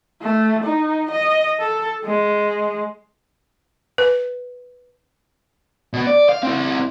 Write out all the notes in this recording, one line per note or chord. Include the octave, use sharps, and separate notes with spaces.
A3
D#4
D#5
A4
G#3
B4
B2 B3
D5
F5
C4 E4